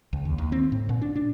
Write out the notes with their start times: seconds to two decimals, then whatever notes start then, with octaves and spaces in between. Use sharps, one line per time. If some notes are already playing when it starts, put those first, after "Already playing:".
0.13 C#2
0.25 D#2
0.38 D#2
0.52 C4
0.72 A2
0.89 A#2
1.02 D4
1.16 D4